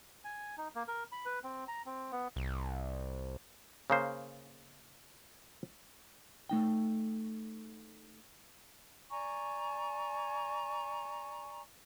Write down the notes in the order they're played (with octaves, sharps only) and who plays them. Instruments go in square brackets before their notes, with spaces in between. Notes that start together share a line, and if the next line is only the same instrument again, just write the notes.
[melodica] G#5
D#4
A#3
A#4
B5
B4
C4
A#5
C4
B3
[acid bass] C2
[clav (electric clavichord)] C#3 A#3 C5
[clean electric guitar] A3 D#4 G5
[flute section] D5 G#5 A#5 C#6